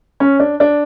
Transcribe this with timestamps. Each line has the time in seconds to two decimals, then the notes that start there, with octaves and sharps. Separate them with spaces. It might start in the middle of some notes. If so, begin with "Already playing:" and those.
0.20 C#4
0.40 D4
0.60 D4